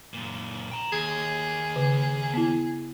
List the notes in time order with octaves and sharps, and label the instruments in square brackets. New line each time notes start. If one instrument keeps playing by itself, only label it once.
[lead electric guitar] F#2 A#2
G5 A#5
[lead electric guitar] D#2 [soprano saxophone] G#4
[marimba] C#3
B3 E4